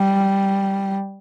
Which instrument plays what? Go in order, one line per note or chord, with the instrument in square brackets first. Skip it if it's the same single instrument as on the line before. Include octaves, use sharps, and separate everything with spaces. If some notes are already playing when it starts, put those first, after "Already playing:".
Already playing: [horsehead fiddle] G3